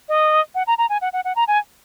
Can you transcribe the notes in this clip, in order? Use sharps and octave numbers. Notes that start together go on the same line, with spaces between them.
D#5
F#5
A#5
A#5
G#5
F#5
F#5
F#5
A#5
G#5